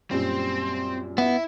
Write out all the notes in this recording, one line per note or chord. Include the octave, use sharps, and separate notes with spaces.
F#2 A#2 G3 C4
B3 E4